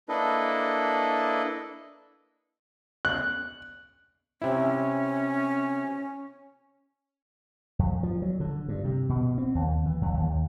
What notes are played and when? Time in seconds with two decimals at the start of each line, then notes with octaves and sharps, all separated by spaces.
0.09 A#3 D4 E4 A4 B4 D#5
3.05 F#6
4.42 C3 C#4 E4
7.79 F2
8.03 F3
8.22 F#3
8.40 D3
8.68 G2
8.84 C3
9.09 B2
9.38 C4
9.55 D#2
9.86 E3
10.01 F2
10.14 D#2